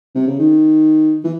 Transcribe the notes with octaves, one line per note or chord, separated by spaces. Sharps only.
C3
C#3
D#3
E3